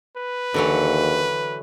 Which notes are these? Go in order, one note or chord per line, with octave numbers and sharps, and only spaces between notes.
B4
D#2 D3 E3 F#3